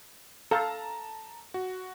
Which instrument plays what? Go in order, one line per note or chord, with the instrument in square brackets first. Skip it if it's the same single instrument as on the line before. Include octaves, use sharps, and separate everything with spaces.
[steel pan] A4 F5 [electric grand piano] A5 A#5
[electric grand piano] F#4